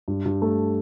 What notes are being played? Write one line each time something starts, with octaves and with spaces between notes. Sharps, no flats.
G2
G2
A3